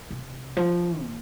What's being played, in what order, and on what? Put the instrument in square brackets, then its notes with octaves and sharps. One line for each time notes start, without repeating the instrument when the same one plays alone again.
[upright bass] C3
F3
A#2